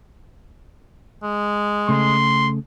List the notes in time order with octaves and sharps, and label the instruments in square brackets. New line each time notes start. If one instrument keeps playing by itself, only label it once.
[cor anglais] G#3
[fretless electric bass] C#3 A3 [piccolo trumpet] C6